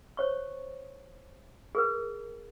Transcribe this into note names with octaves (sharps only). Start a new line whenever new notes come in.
C5 C#5 C#6
G#4 A#4 B4